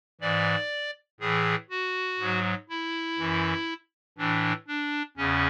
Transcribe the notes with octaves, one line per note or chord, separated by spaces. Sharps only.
G#2 E3 D5
A2 E3 G#4
F#4
G#2 F#3
E4
F#2 E3
A2 E3 D4
D4
E2 C#3 C#4